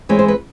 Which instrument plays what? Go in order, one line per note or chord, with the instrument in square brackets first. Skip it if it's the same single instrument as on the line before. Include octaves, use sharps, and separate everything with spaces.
[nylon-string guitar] E3 G#3 C4 C#5
C5
B4